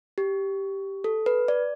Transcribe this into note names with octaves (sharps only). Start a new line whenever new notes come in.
G4
A4
B4
D5